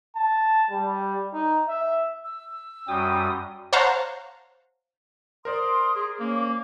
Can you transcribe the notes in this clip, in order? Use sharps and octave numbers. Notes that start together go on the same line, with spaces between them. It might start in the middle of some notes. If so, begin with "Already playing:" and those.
A5
G3
D#4
E5
E6
F#2 G3 F#4 G5 C#6 D#6
C5 C#5 F5 F#5 A5 A#5
A#4 C5 D5 C6 D#6
G#4
A#3 C#4 D6